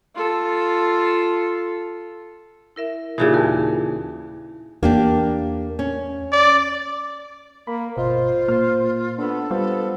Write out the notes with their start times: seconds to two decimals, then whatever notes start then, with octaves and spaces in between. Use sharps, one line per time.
0.15 F4 A4
2.76 E4 A#4 E5
3.18 A#2 C#3 E3 D#4 F#4 G4
3.33 D#2 A#4 A5
4.83 E2 A#3 D4 G4
5.79 C#4
6.32 D5
7.67 A#3 B5
7.97 G1 B2 F4 C5 D#5 F5
8.48 A#2 A#3 F6
9.18 B3 D4 A4
9.51 G3 B3 F4 C5 F5